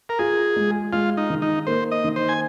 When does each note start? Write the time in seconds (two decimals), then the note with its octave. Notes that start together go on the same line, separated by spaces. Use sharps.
0.09 A#4
0.19 F4 G#4
0.56 G#3
0.93 G#3 F4
1.17 D#4
1.30 D#3
1.42 D#4
1.67 A#3 C5
1.91 D#5
2.04 D#3
2.16 C5
2.29 G#5